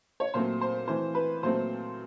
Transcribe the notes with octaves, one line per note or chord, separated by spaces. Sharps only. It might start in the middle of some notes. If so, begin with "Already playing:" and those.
C#5
A#2 F#3 A3 C4 C5
C5
E3 A3 C4 C5
B4
A#2 F#3 A3 C4 C5